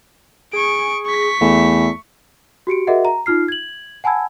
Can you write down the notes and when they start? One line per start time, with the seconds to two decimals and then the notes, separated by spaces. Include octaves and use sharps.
0.53 G#4 C#6 D7
1.06 C#6 B6
1.41 E2 A3
2.67 F#4 G4 C#7 D7
2.87 F#4 G#4 A#4 D#5 E5 F#5
3.05 A#5
3.26 D#4 F4 F6 C7
3.48 G#6 F#7
4.04 F#5 G#5 A5 B5 E6 G#6